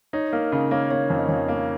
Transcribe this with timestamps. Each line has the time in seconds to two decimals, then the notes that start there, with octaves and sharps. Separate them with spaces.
0.13 D#4 C#5
0.33 A#3 A#4
0.52 C#3 A#4
0.71 A#3 C#5
0.91 A#3 C#5
1.10 F2
1.19 D#5
1.29 F2 C#5
1.48 A#3 C#5